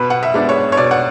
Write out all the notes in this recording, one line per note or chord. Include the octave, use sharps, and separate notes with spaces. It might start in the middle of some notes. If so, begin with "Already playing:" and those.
Already playing: B2 B4 B5
F#5
E5
G#3 B3 D4 D5
C#5
C#5
B2 D5
F#5